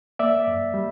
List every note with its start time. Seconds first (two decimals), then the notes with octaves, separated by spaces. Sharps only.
0.19 A#3 D5 E5
0.47 F#2
0.74 G3